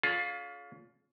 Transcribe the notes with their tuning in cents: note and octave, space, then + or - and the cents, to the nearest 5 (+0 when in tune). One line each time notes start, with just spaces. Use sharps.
C#4 +35 F4 +15 G#4 +40